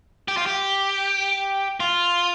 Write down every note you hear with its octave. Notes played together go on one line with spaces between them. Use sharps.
G4
F4
G4
F4